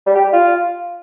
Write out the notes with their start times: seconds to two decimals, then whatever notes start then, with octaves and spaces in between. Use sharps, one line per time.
0.06 G3
0.15 G4
0.24 G3
0.33 F4